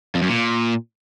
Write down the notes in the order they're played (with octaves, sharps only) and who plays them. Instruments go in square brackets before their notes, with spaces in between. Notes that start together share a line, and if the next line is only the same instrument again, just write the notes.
[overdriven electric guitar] F2
F#2
A#2